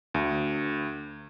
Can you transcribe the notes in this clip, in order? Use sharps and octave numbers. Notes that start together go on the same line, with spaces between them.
D2